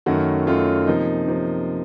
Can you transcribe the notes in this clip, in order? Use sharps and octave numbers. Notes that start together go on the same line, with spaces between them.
F#2 D#3 A3 C#4 F#4
F#2 D#3 A3 C#4 F4
C3 F3 A#3 D#4
C3 F3 A#3